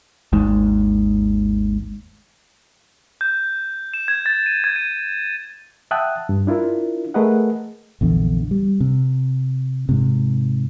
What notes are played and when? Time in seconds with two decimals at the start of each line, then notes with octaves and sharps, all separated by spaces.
0.33 G#1 D#2 G#2
3.21 G6
3.94 E7
4.08 G#6
4.26 A6
4.46 D#7
4.64 G#6
4.76 D#7
5.91 E5 F#5 G5 A5 D#6 F#6
6.29 G2
6.47 D4 E4 F4 A#4
7.14 A3 G#4 A#4 B4 D#5 F#5
8.01 A#1 E2 D3
8.51 G3
8.80 C3
9.89 G#2 C3